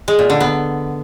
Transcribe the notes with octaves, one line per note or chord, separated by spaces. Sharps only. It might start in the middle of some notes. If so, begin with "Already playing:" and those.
G#3
A#2
D3
B3